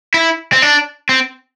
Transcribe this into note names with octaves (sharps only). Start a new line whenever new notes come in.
E4
C4
D4
C4